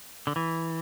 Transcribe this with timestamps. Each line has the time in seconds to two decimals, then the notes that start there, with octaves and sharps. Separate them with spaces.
0.27 D3
0.36 E3